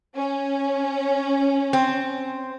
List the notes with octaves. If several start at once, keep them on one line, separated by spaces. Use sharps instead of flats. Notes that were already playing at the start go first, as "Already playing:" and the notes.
C#4
C4